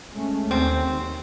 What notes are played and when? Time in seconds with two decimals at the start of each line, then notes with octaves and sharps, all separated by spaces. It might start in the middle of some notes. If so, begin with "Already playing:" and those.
0.11 G#3 A3 C#4
0.51 D#2 C4